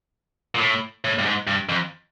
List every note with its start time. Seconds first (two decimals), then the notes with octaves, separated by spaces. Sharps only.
0.55 A#2
0.60 A2
1.04 A2
1.19 G2
1.25 G#2
1.47 G2
1.69 F2